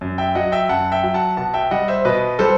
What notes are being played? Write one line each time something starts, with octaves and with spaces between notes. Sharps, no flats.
F#2
E5 G5
F#3 D#5 F#5
E5 G5
F#2 F#5 A5
E5 G5
F#3
F#5 A5
B2 F#5 A5
E5 G5
G3 D#5 F#5
C5 E5
B2 B4 D#5
G3 A4 C5